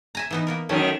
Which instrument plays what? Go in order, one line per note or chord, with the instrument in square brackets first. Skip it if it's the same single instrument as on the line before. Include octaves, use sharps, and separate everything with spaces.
[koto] E5 G#5 A#5
E3 B3 D#4
A#3 B3 A#4
[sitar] F#2 D#3 A3 [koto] C#4